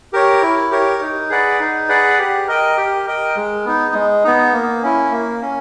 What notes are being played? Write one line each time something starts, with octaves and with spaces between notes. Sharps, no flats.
G4 A#4 C#5
E4
G4 A#4 C#5
D#4
G#4 B4 D5 F#5
D#4
G#4 B4 D5 F#5
G4
A#4 D#5 G5
G4
A#4 D#5 G5
G#3
B3 D#4
G#3
B3 D#4
A#3
C#4 E4
A#3
C#4